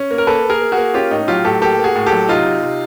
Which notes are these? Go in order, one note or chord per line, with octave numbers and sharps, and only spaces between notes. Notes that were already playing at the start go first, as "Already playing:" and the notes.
Already playing: C#4
A#3
A#4
A#3 A4 B4
A#3
G#4 A#4
A#3
F#4 G#4
A#3
C#4 F4 G4
A2 D#4
F#3 F4 G4
A2 G4 A4
A#3 G4 A4
A#3
F#4 G#4
A2
G4 A4
F#3
C3 D#4 F4
C3
C3